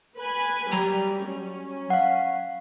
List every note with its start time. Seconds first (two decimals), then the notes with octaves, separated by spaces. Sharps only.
0.19 B4 G#5 B5
0.72 F#3 G3 A#5
1.28 C#4
1.90 F5 F#5